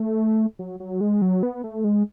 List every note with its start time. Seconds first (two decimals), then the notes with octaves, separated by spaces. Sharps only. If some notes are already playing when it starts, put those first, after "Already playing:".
Already playing: A3
0.59 F#3
0.80 F#3
1.01 G#3
1.22 F#3
1.43 B3
1.64 A3
1.84 G#3